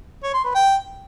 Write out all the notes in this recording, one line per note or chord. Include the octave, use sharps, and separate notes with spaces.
C#5
C6
B4
G5